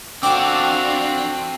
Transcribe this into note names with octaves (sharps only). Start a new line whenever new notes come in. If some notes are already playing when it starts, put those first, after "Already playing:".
C4 D4 F#4 A4 F5 G5 D6